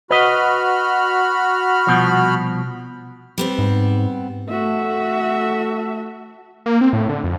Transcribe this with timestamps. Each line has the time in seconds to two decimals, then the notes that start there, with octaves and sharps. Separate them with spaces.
0.11 F#4 B4 D#5 B5 F6
1.87 C2 B2 F3
3.38 G3 B3 C4
3.59 G#2
4.49 A3 F#4 E5
6.66 A#3
6.81 C4
6.93 A2
7.09 D3
7.24 F2